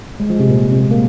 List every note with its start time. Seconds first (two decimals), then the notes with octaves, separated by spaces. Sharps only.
0.20 G#3
0.30 F3
0.40 C3
0.50 A#2
0.71 C3
0.81 G#3
0.91 A#3